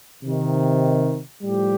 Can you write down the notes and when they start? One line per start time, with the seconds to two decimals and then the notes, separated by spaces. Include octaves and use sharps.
0.23 C3 D#3
1.43 A2 F3 G3 G4